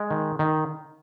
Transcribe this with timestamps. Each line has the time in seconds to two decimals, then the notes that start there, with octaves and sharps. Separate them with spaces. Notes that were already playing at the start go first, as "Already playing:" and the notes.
Already playing: G#3
0.11 D#3
0.39 D#3